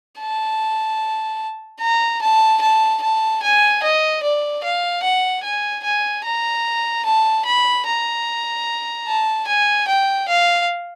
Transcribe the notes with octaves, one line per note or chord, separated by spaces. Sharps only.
A5
A#5
A5
A5
A5
G#5
D#5
D5
F5
F#5
G#5
G#5
A#5
A5
B5
A#5
A5
G#5
G5
F5